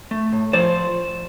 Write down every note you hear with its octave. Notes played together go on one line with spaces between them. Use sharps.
A3
A2
F3 C5 D5